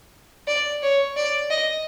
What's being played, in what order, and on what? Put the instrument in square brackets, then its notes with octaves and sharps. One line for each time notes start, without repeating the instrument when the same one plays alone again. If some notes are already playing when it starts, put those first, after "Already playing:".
[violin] D5
C#5
D5
D#5